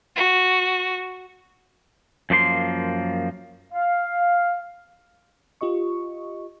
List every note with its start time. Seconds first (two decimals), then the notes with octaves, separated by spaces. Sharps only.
0.16 F#4
2.30 F#2 F3 A#3 C6
3.73 F5
5.61 F4 G4 D#5 C#6